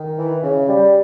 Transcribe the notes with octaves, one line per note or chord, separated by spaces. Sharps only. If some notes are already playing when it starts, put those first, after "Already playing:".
Already playing: D#3
E3
C#3
G3